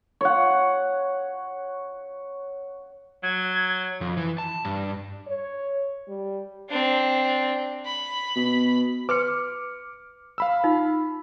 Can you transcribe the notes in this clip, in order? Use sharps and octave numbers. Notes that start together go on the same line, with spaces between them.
C#5 F#5
F#3 G#6
F2
E3
A5
G2
C#5
G3
C4 D4
B5
B2
B4 C6 D6 F6 C#7
F5 B5 E6
D#4 F4